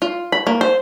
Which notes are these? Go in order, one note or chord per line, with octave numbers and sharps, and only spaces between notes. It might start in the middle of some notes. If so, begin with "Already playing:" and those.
F4
B5
A#3
C5